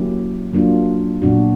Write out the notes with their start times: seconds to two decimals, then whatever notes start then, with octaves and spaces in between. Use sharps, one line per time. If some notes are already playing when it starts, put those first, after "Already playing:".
Already playing: F#3 A#3 C#4 E4 G4
0.53 F#3 A#3 D4 F4
1.22 A#2 F#3 B3 D4 F#4